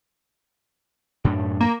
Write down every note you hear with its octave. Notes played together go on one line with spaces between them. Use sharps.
F#2 A2 D4
A#3